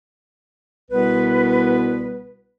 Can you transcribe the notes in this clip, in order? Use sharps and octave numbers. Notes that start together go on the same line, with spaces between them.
C2 B2 B3 B4